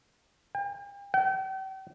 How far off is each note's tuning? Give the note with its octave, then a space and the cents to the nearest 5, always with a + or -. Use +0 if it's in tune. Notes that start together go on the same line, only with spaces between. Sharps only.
G5 +40
G5 -40